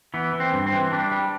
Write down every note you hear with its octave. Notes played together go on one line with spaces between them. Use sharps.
E3 B3
E3
C4
G2
C4
E3
G3 D4
G3